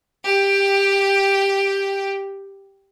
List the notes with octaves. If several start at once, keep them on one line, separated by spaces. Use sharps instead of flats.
G4 G5